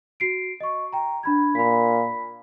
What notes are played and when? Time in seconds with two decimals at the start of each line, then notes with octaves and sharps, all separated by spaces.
0.20 F#4 C7 D7
0.60 D#5 C#6
0.92 G5 A#5
1.23 D4 B5 G#6
1.55 A#2 B5 B6